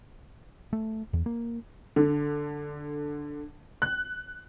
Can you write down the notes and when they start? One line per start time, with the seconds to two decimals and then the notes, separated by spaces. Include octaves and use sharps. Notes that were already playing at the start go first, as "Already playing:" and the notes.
0.73 A3
1.13 E2
1.26 A#3
1.96 D3
3.82 F#6